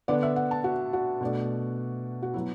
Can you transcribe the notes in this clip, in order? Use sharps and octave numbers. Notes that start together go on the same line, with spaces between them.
D3 B3 D4 D5
E5
F#5
A5
F#4
F#4
B2 A3 D4
F#4
F#3 B3 E4